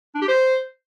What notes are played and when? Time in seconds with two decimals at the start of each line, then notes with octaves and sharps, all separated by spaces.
0.15 D4
0.22 G4
0.28 C5